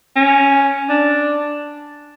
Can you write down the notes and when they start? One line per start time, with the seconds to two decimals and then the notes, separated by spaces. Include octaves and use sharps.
0.16 C#4
0.89 D4